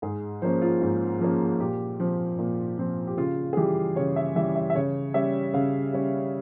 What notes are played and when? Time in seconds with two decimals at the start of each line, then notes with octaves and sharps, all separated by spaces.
0.02 G#2 G#4
0.42 F3 A#3 C#4 C5
0.62 F4
0.81 G#2
1.21 F3 A#3 C#4
1.60 A#2 G4
2.00 F3 C4
2.39 A#2
2.78 F3 C4
3.07 G4
3.17 C#3 F4
3.53 G#4
3.57 E3 G3 G4
3.96 C#3 C#5
4.16 E5
4.36 E3 G3 E5
4.55 E5
4.70 E5
4.75 C#3 C#5
5.14 G3 C#4 E5
5.54 C#3 F5
5.93 G3 C#4